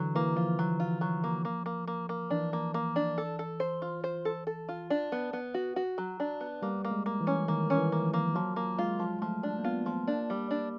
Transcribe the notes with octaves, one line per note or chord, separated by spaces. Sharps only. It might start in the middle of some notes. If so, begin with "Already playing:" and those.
Already playing: D3 E3 F#3
E3 A#3
F3 F4
F#3
F4
F#3
A#3
A#3
A#3
A#3
A#3
E3 D4
A#3
A#3
D4
A4
A4
C5
F4
C5
A4
A4
F4
D4
B3
B3
F#4
F#4
F#3
D4
B3
G3 A#3
A#3
G#3
A#3
E3
C#4
D#3 A#3
C#4
E3
A#3
F3
A#3
F3 F#3
A#3
G#3 F4
F3
F3 A3
D4
A#3
B3 F4
F3
A#3 D4
G3
D4